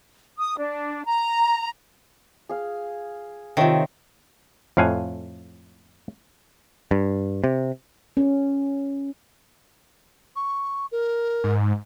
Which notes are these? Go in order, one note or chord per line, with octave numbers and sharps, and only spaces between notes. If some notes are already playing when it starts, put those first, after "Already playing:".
D#6
D4
A#5
G#4 F5
C3 D#3 F4 C#5 E5
F2 A2 F5 F#5 G#5
G2
C3
C#4
C#6
A#4
G#2